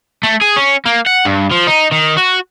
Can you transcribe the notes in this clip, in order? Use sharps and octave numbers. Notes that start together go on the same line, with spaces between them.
A3
G#4
C#4
A#3
F#5
G2
F3
D#4
D#3
F#4